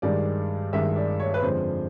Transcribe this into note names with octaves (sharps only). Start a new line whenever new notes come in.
G2 D#3 G#3 D5
G2 D#3 G#3 E5
D5
C#5
B4
F2 D3 F3 G#3 C5